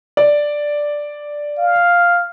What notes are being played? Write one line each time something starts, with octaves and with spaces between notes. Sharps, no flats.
D5
F5